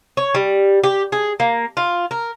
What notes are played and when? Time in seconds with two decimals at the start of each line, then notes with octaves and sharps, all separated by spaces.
0.17 C#5
0.35 G3
0.84 G4
1.12 G#4
1.40 A#3
1.77 F4
2.11 A#4